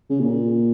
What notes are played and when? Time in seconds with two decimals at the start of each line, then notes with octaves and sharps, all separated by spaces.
0.10 C#3
0.20 A#2